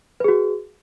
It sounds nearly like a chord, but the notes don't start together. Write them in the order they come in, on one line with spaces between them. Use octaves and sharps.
B4 G#4 F#4